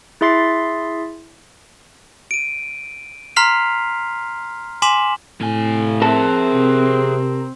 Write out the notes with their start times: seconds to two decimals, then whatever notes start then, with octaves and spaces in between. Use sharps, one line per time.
0.21 E4 G#4 E5 C6 A6 C7
2.31 D7 D#7
3.36 A#5 C6 F6 B6 C7 F7
4.82 G#5 C6 D6 B6 E7 F#7
5.41 A2 C3 G#5
6.02 C4 G#4 A#4 E5 A5
6.54 C3